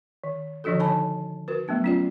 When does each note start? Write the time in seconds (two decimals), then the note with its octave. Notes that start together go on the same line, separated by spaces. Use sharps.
0.24 D#3
0.64 D3 D#3 F3 D4 F#4 A4
0.79 D#4 A4 C#5 G#5 A5 B5
1.48 F#4 A#4 B4
1.68 F#3 A3 B3 D4
1.84 C#4 F4 D5